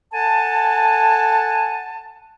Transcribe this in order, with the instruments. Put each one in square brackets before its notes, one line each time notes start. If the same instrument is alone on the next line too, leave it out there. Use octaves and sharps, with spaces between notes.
[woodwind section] A4 F#5 G#5 A5